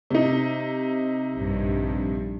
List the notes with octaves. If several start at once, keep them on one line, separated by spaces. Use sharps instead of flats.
C3 D#4
A#1 G2